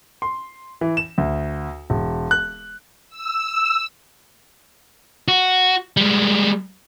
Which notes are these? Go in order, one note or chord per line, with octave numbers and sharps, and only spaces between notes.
C6
E3
E7
D2
E1
F#6
E6
F#4
G3 G#3